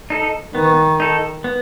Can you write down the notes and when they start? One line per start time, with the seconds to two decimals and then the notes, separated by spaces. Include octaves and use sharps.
0.10 D#4 A4
0.55 D#3 B3
1.00 D#4 A4
1.44 B3